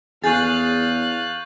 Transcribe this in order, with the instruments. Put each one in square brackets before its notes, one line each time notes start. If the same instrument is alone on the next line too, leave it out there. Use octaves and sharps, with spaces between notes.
[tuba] E2 [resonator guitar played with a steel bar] G#4 [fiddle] F5 F#6 [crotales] C#6 G6 A6